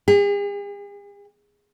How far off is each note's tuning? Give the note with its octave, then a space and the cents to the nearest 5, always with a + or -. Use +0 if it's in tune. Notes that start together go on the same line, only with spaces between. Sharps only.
G#4 -45